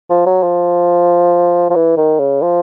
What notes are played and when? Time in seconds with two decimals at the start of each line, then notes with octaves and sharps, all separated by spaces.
0.10 F3
0.26 F#3
0.43 F3
1.70 F3
1.75 E3
1.97 D#3
2.20 C#3
2.42 F3